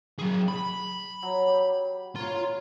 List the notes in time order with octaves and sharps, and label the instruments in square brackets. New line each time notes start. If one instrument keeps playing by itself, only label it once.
[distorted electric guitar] F#3 G#4
B5
[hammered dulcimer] F#3
G4
[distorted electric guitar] F4 C6 [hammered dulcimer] A#4 C#5